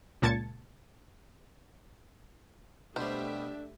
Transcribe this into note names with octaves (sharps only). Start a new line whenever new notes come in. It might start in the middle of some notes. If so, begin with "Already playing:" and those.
C#2 A#2 A5 G#6 A6 C#7
B2 G3 A3 D4 G4 C5 E5